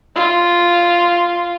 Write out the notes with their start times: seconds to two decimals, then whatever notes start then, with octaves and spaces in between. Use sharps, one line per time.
0.16 F4